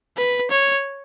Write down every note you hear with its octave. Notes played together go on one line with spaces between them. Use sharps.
B4
C#5